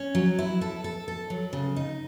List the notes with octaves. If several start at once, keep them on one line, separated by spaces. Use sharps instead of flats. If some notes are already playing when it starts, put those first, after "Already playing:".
Already playing: C#4
F#3
E4
A4
A4
A4
F#3
C#3
D#4